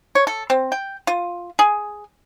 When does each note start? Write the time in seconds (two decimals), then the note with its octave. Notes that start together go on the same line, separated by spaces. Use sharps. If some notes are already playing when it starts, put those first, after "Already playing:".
0.15 C#5
0.27 A4
0.50 C4
0.72 G5
1.07 F4
1.59 G#4